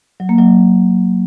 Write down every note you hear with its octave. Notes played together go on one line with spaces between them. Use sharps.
F#3
A#3
F#3